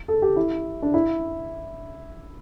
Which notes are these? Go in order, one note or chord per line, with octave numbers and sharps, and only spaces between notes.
A4
G4
E4
D4
E4